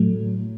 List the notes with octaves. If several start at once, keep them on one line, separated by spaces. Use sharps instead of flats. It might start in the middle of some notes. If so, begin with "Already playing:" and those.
Already playing: A2 F#3 A3